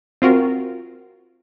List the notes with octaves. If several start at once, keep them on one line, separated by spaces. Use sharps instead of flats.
C4 F4 F#4 A#4